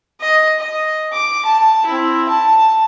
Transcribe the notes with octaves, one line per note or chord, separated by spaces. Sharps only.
D#5
D#5
D6
A5
C4 E4
A5